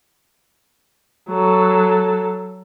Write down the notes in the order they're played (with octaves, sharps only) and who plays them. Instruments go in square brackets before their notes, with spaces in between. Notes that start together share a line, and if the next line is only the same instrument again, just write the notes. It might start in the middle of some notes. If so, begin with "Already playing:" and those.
[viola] F#3 A4